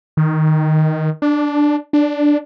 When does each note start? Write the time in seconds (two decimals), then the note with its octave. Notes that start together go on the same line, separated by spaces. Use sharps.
0.17 D#3
1.22 D4
1.93 D4